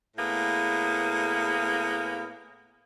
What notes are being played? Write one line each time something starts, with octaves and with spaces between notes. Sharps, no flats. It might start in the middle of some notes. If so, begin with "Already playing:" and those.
A2 A#3 B3 G#4